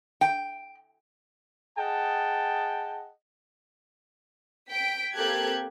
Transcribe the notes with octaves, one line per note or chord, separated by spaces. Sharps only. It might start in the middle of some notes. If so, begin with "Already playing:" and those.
G5
G#4 D#5 F#5 G5 A5
G5 B6 D7
A#3 C4 G4 A4 F#6 G#6